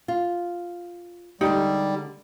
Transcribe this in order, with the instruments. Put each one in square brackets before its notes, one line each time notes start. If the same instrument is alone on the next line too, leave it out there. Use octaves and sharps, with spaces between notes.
[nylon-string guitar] F4
[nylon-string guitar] D3 G#3 G4 [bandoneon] G3 [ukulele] D#4